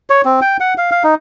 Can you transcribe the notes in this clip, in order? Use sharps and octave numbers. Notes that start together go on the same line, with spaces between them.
C#5
C4
G5
F#5
F5
F5
D#4